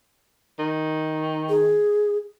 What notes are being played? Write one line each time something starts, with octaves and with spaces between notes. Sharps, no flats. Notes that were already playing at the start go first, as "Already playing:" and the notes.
D#3
G#4